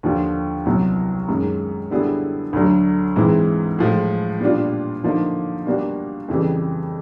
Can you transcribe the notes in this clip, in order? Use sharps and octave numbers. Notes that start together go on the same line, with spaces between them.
D#2 D3 F3
C2 B2 F#3 B3 E4
F#2 D#3 G#3
D3 G3 B3 E4 G#4
D2 D3 F#3
G#2 E3 G#3 C4 E4
A2 F3 G#3
A#2 G3 B3 D4 F4
D3 F3 A#3 D#4
B2 G3 A#3 D4 F#4
F2 C#3 E3 G3